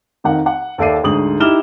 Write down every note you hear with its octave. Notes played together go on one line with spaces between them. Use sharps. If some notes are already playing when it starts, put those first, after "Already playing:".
F2 D#3 D#4 F5 F#5
F#5
D#2 A4 D5 E5 C7 D#7
D2 G#2 D#6 F#7
D#4 E4 G4 F6 E7 G7